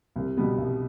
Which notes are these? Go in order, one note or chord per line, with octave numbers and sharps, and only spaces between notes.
C2
B2 G3 B3
C2